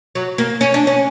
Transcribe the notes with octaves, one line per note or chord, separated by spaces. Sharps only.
F#3
A#3
C#4
D4
C#4